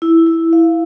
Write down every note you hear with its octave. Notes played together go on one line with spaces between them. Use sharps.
E4
E4
F5